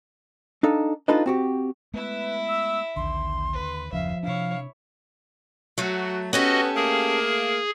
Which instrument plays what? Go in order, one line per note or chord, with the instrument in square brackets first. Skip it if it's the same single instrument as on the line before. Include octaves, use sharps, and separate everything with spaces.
[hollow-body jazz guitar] D4 D#4 A4 F5
D4 D#4 F4 A4 B4 D#5
C4 F#4 G4
[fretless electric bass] G#3 A3 B3 [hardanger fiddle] E4 E5 [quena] B4
[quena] E6
[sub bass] A#1 [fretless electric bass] D#2 D3 [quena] C6
[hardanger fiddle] B4
[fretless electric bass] F#1 D#2 C#3 [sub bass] F3 [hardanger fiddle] E5 [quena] F5
[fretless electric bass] C3 D4 [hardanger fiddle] E4 C#5 [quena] F5
[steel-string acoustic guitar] F#3 A3 [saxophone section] F#4
[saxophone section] B3 [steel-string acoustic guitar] C#4 G4 A4 [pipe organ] F#4 D#5
[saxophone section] A3 A#3 [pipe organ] G#4